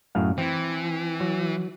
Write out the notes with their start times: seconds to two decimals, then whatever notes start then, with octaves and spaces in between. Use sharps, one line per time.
0.15 F#2 A2 F5
0.38 E3 C4
1.20 F#3